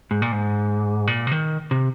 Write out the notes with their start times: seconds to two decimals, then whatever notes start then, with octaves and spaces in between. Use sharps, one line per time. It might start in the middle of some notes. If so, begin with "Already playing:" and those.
0.11 G#2
0.22 A#2
0.32 G#2
1.07 A#2
1.27 C3
1.32 D#3
1.71 C3